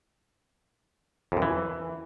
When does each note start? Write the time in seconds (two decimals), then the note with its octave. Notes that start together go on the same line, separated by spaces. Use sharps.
1.32 F2
1.37 F#2
1.42 E3